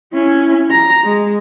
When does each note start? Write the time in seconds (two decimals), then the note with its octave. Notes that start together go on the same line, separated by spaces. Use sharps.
0.13 C#4 E4
0.71 A#5
1.04 G#3